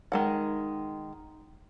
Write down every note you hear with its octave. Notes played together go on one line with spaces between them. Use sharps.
D#3 G#3 F#5